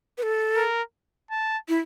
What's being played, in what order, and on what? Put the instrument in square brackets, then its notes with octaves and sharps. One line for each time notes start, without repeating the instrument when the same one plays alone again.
[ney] B4
A4
[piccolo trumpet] A#4
A5
[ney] E4